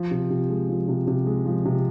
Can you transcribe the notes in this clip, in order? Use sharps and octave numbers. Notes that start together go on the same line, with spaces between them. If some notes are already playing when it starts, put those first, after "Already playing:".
Already playing: F3
C3
C3
G#3
F3
C3
C3
G#3
F3
C3